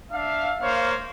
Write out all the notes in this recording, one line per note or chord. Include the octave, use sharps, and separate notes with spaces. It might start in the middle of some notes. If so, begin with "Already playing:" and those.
D4 E5 F5
A#3 C5 C#5 F5